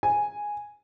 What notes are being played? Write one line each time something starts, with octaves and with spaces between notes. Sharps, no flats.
G#5